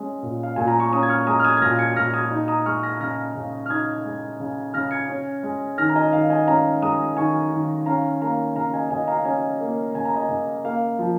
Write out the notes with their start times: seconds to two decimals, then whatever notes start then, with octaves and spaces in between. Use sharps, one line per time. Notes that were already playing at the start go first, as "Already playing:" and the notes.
Already playing: G#3 C#4
0.23 A#2
0.43 F5
0.56 A#2 G#5
0.68 A#5
0.80 C#6
0.92 C#4 A#5 D#6
1.03 G#6
1.09 C#6 F6
1.27 G#3 A#5 D#6
1.39 F6
1.44 D#6 G#6
1.57 G#6
1.61 A#2 F6 A#6
1.79 G#6 C#7
1.96 A#2 F6 A#6
2.14 D#6 G#6
2.31 D#4
2.48 A#5 D#6
2.66 G#3 C#6 F6
2.83 F6 A#6
3.00 C#3 F6 A#6
3.35 C#3
3.66 F6
3.69 D#4 D#6 G#6
4.05 G#3
4.40 C#3
4.74 C#3 F6 A#6
4.91 G#6 C#7
5.09 C#4
5.43 G#3
5.78 D#3 F6 A#6
5.90 A#5
5.96 D#5 G#5
6.13 D#3 F5
6.30 D#5 G#5
6.47 C#4 F5 A#5
6.82 G#3 A#5 D#6
7.17 D#3 G#5 C#6
7.52 D#3
7.86 C#4 F5 A#5
8.21 A#3 F5 A#5
8.56 C#3 F5 A#5
8.74 D#5 G#5
8.91 C#3 D#5 G#5
9.08 F5 A#5
9.25 C#4 D#5 G#5
9.60 A#3
9.94 C#3 G#5
10.05 A#5
10.16 D#5 G#5
10.29 C#3
10.64 A#3 F5
10.99 F3